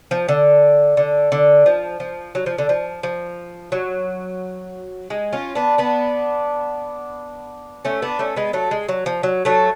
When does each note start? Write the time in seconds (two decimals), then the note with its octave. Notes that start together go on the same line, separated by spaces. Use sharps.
0.11 F3
0.28 D3
0.97 D3
1.32 D3
1.66 F3
2.00 F3
2.35 F#3
2.46 F3
2.58 D3
2.69 F3
3.03 F3
3.72 F#3
5.10 G#3
5.33 C#4 F4
5.55 B3 D4
5.78 B3 D4
7.85 A3 C#4
8.02 B3 D4
8.19 A3 C#4
8.36 G#3 B3
8.53 F#3 A3
8.71 G#3
8.88 F#3
9.06 F3
9.23 F#3
9.45 F#3 A3